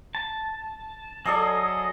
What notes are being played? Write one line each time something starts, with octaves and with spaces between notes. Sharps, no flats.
A5
F#3 G#4 A4 D5 D#5